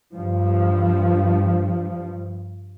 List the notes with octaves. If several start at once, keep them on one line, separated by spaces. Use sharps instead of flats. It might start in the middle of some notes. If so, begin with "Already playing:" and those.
G2 F3